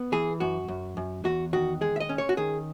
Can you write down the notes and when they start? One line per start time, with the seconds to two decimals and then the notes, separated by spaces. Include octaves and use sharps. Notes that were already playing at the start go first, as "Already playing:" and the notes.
Already playing: B3
0.12 E3 G#4
0.40 F#2 F#4
0.68 F#2
0.97 F#2
1.25 E2 F#4
1.53 D#3 F#4
1.81 G#3 G#4
1.96 E5
2.00 D#5
2.09 C#4
2.18 C#5
2.29 F#4
2.37 D#3 G#4